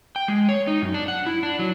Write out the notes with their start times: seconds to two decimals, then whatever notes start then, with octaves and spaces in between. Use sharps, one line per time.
0.16 G5
0.28 G#3
0.49 C#5
0.67 D#4
0.82 F#2
0.94 D4
1.08 F#5
1.26 E4
1.43 D4
1.59 F#3